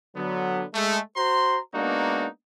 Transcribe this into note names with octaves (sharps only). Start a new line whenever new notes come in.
D3 F#3 B3
G#3 A3
F#4 C5 A#5 C6
G#3 A#3 B3 D4 D#4 F#4